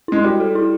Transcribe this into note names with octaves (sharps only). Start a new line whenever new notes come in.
G#3 E4
G3 F#4
A4
E4